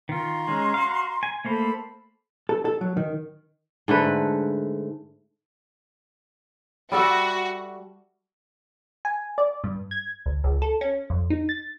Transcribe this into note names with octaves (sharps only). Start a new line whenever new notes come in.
D#3 F4 A#5 C6 C#6
G#3 C#4
F#4 F5
G#5
A3 A#3 A4 C5 B5
A4
A4
F#3
D#3
G#2 D3 A3 B4
G3 F#4 A4 E5
G#5
D5
G2
G#6
D2
C#2
A4
C#4
F2
D#4
A6